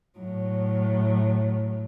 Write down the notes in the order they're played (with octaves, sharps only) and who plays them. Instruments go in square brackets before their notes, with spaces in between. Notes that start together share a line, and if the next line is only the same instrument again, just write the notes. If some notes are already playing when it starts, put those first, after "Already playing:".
[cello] A2 F#3